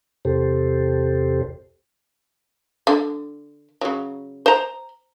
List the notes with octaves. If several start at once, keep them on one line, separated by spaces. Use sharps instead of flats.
E2 C3 G4 A4 C5
D3
C#3 F#3
C5 A#5